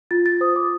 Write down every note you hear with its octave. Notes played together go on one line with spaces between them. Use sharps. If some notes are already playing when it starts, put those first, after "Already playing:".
F4 A6
A6
C5 D#6
D6